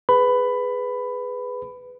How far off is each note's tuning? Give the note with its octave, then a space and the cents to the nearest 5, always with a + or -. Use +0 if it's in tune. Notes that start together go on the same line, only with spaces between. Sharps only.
G#4 +0 B4 +10 B5 +15